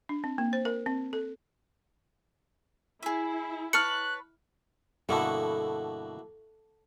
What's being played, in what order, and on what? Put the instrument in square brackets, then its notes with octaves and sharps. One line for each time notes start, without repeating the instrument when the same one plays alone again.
[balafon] D4
C4
A#3
C5
A#4
C4
A4
[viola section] E4 [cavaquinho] G#4 E5
[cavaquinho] B4 C#5 A5 [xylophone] F6 C#7 [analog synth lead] F#6
[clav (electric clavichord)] G2 B2 D3 [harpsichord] A#3 E4 F#4 [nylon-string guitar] A4